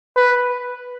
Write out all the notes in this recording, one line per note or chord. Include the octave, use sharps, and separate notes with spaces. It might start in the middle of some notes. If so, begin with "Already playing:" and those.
B4